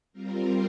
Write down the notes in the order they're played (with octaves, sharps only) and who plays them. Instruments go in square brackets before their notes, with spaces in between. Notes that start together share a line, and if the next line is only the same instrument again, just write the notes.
[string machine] G3 C4 F4 A#4